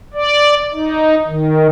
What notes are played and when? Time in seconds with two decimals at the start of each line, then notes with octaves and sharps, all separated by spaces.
0.14 D5
0.73 D#4
1.26 D#3